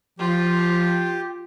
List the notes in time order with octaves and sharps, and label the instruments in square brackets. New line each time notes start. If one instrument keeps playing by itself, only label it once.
[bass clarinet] F3 [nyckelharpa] F4 [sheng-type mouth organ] G4